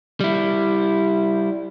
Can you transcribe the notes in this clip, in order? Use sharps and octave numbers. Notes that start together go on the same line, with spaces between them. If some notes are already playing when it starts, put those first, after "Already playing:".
G3 E4